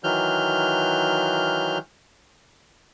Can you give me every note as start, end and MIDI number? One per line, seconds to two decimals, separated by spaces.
0.04 1.78 51
0.04 1.78 52
0.04 1.78 54
0.04 1.78 89
0.04 1.78 91